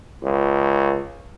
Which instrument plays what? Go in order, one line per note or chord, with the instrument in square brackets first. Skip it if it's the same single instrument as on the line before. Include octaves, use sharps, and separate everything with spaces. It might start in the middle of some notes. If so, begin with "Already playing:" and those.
[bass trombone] C#2